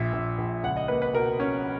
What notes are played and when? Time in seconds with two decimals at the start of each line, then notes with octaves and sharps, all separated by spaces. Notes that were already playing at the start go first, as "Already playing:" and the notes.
Already playing: A#1 A#2 E5
0.13 A#1
0.38 A#1
0.63 C#2 F#5
0.77 D#5
0.88 A#3 B4
1.02 B4
1.14 B2 A#4
1.40 C#4